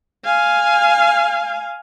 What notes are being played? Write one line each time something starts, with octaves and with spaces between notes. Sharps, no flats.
F5 G#5